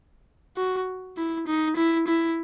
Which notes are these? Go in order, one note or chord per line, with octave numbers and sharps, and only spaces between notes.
F#4
E4
D#4
E4
E4